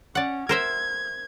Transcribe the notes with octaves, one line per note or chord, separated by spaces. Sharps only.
C#4 D5 F#5
A#4 C5 E5 G#6